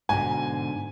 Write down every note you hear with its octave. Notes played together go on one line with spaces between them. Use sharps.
G#2 B2 D3 G#5